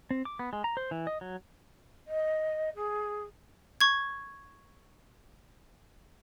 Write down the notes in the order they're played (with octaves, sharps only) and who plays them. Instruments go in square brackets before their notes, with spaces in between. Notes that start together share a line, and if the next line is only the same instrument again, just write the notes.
[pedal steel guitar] C4
D6
B3
G#3
A#5
C5
E3
D#5
F#3
[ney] D#5
G#4
[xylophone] C#6 G#6